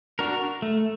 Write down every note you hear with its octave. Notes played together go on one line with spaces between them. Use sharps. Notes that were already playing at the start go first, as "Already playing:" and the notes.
D4 F#4 A#4
A3